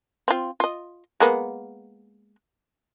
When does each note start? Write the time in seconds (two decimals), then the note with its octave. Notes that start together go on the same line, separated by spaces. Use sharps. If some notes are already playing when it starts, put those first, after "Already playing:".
0.28 C4 F4
0.60 F4 D#5
1.20 G#3 A#3 B3